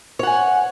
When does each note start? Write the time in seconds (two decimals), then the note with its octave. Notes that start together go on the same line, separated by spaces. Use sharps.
0.19 C#5
0.23 F#5
0.27 G#5